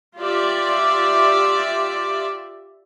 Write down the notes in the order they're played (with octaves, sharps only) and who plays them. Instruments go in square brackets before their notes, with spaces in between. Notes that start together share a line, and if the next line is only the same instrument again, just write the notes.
[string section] F4 G4 D5 E5